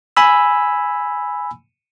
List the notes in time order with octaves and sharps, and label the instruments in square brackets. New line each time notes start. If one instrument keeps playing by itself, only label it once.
[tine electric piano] G#5 B5 E6